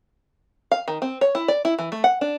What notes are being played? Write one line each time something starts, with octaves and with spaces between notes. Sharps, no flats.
F5
D#3
C4
C#5
E4
D5
E4
E3
A3
F#5
D4